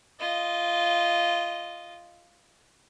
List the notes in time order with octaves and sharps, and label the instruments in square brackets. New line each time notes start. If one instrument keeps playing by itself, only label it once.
[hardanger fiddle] F4 D#5